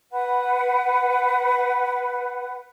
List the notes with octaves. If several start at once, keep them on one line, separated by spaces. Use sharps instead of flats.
B4 F#5